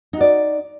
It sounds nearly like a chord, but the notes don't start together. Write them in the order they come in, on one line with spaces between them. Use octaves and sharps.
D#4 F#4 D5